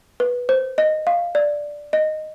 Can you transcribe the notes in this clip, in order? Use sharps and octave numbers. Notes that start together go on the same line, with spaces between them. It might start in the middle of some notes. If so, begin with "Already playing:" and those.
B4
C5
D#5
F5
D5
D#5